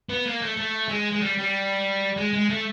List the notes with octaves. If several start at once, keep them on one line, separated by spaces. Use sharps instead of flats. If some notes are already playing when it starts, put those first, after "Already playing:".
B3
A#3
A3
A3
G#3
G#3
G3
G3
G#3
G#3
A3